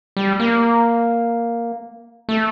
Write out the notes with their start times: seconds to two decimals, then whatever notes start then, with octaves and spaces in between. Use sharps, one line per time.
0.17 G3
0.40 A#3
2.29 A3